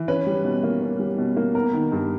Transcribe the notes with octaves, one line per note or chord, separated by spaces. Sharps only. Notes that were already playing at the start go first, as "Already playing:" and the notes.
Already playing: E3
C#4 B4
G3
B2
A#3
C#4
G3
B2
A#3
B3 A#4
D#3
G2